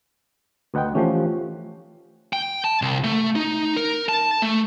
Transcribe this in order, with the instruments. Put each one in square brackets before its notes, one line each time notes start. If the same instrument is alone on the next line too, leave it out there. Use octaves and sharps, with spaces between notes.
[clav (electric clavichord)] D2 F#5 [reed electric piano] B4 D#5 G5
[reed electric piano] E3 A3 G4 [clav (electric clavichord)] F3 C#4
[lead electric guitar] G5
A5
C2
A3
D#4
A#4
A5
A3